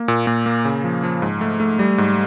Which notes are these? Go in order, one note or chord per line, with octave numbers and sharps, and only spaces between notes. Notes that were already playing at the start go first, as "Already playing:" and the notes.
Already playing: A#3
A#2
A#2
A#3
C#3
F3
F3
G#2
A3
A3
G3
G#2